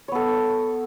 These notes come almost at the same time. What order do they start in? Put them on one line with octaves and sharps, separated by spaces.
C#5 B3 A4